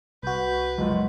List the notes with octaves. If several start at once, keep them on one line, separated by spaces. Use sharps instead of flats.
C2 F#4 B4 G6
F#1 F3 G#3